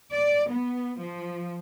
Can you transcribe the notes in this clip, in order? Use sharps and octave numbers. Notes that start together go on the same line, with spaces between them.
D5
B3
F3